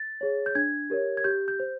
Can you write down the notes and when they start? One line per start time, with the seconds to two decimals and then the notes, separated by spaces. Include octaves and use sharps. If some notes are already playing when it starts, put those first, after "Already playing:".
Already playing: A6
0.21 G#4 C#5
0.46 G6
0.55 D4 G#6
0.90 G4 A#4 C#5
1.17 G#6
1.24 G4 G6
1.48 G6
1.60 C5